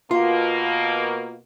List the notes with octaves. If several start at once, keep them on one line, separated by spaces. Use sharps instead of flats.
B2 A#3 F4